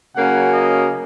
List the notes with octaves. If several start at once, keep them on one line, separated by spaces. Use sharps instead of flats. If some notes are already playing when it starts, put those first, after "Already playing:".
C#3 F#3 A#3 C#4 F#5
D#5